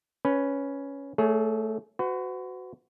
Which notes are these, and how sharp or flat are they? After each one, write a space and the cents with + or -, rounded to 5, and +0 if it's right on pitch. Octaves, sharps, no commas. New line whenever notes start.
C#4 +5 B4 +0
A3 +0 G#4 +30 C#5 +15
F#4 +0 B4 +45